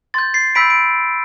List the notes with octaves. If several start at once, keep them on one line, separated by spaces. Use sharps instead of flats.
C6 G6 A6
A6 C7
B5 E6 G6 B6 D7
D7